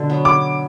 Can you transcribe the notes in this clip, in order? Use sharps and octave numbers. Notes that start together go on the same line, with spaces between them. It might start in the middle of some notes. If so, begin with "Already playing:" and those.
Already playing: B2 D3
F#3 B3
D6